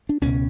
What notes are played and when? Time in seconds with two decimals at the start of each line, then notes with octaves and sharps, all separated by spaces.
0.09 D4
0.21 C#2 B2 C#4